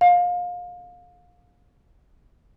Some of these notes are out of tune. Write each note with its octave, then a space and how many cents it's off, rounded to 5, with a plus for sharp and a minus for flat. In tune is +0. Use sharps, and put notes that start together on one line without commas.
F5 +25